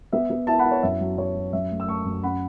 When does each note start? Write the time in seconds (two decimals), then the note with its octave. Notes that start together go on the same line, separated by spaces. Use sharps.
0.13 B3 E5
0.30 B3
0.47 E4 E5 A5
0.59 F#5 B5
0.65 E4
0.72 C#5
0.83 F#2 E5
1.01 F#3
1.18 F#3 C#5
1.35 F#3
1.53 F#2 E5
1.71 A3
1.80 E6
1.87 A3 A5 C#6
2.05 F#2
2.23 C#4 F#5 B5